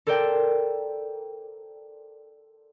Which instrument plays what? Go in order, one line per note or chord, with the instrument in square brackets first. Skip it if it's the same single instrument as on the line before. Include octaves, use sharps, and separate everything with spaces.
[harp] A4 A#4 C5 D5 G5